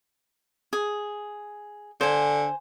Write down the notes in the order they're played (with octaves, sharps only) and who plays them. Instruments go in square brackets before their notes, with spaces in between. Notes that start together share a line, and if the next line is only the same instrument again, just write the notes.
[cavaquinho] G#4
[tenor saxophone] D3 [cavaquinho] C5 G#5